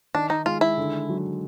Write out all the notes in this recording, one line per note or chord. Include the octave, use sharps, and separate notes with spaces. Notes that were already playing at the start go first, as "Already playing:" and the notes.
D#3 D4
D#4
G#3 F4
E4
D3
F#3